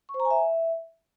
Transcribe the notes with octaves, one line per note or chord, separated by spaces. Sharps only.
C#6
C5
A#5
G#5
E5